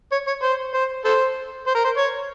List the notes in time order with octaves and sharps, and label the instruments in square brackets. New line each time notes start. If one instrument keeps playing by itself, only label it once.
[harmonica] C#5
C#5
C5
C5
A4 C5
C5
A#4
C5
C#5